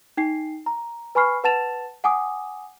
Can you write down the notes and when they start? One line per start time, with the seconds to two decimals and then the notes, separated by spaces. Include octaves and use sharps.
0.17 D#4 G5 C7
0.66 A#5
1.15 B4 G#5 B5 C#6 F6 C7
1.44 B4 F#5 A5 A6 E7 F7
2.04 F#5 G#5 D6 D#6